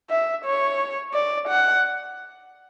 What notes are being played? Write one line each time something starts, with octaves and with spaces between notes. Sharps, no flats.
E5
C#5
D5
F#5